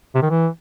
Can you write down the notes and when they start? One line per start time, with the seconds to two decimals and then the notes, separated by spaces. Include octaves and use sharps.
0.15 C3
0.22 D#3
0.30 E3